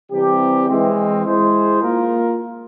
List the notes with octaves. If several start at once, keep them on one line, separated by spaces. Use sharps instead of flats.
C3 E3 G3 C4 G4
E3 G#3 C4
G#3 E4 G#4 C5
A#3 F4 A#4